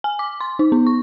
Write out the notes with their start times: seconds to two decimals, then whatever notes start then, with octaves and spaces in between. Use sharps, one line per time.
0.04 G#5
0.19 D6
0.41 C6
0.59 D#4
0.72 B3
0.87 C#6